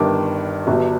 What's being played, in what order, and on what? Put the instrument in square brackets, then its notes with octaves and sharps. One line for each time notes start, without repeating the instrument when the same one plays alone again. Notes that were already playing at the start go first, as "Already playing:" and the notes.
Already playing: [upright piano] G1 G2 D#3 D6
G1 G2 F#3